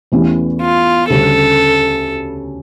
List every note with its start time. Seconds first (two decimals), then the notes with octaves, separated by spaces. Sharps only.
0.12 E2 E3 A3 C#4 G4
0.61 F4
1.09 D2 C#3 G3 C#4 A4